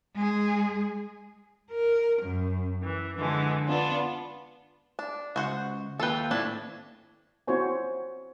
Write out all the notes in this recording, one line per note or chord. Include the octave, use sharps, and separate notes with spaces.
G#3 G#4
A#4
F#2
E3
D3 E3 F3 G#3
B3 D4 F4
D4
C#2 F#4 C5 F#5
D#2 F4 A4 B4 G5
A2 C4 D4 E4
C4 E4 F#4 C5 C#5 G#5